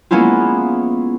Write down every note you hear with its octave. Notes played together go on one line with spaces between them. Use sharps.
G#3 A#3 B3 C#4 E4 F4